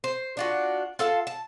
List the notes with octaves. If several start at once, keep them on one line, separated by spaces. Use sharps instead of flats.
C5
D4 F4 F#4
F4 A4 F5 A5
A5